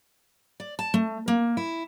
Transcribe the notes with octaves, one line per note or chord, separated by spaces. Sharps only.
D5
A5
A3
A#3
E4